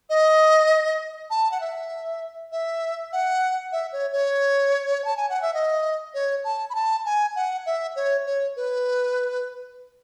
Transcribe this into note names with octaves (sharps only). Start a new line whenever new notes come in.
D#5
A5
F#5
E5
E5
F#5
E5
C#5
C#5
A5
G#5
F#5
E5
D#5
C#5
A5
B5
A5
G#5
F#5
E5
C#5
C#5
B4